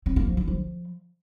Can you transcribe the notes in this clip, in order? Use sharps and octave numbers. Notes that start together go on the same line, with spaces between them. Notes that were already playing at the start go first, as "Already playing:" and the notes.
C4
A#3
F3
D4
F3